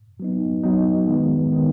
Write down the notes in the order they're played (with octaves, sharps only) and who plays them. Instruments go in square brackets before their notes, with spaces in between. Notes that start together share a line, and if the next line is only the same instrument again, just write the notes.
[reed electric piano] F#3 B3 D#4
F#3 B3 D#4
D#3 G#3 B3
D#3 G#3 B3